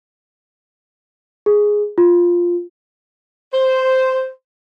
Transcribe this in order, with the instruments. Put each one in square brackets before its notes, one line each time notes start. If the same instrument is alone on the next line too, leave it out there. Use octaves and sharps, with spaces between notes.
[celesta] G#4
F4
[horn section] C5